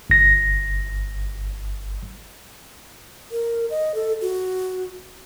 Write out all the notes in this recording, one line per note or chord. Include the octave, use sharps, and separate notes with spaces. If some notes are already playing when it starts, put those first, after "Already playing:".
G1 A#6
A#4
D#5
A4
F#4